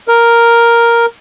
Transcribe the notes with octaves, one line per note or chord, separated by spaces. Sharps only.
A#4